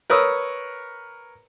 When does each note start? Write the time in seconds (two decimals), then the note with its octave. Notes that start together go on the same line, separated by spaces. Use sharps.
0.10 A#4 B4 C#5 D#6 E6